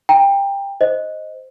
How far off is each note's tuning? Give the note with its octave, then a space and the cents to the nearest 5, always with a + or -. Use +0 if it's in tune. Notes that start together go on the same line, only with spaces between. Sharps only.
G5 +20 A#5 +0
C5 +0 D#5 +0